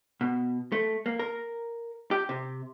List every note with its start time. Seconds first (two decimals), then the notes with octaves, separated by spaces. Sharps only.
0.21 B2
0.72 A3
1.06 A#3
1.19 A#4
2.11 G4
2.29 C3